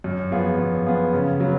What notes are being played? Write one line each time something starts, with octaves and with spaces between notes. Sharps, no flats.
F#2
F3 B3 F4 G#4
F#2
F3 B3 F4 G#4
C#3
F#3 B3